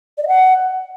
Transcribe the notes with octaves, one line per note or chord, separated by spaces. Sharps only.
D5
D#5
F#5